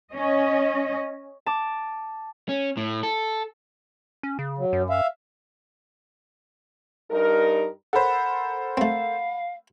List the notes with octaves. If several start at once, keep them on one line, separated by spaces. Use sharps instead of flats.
C#4 D#5
A5 D6
C#4
A2
A4
C#4
C#3
F#3
F#2
E5 F5
G2 G3 D#4 A#4
A4 A#4 C5 F#5 B5
A3 C4 F5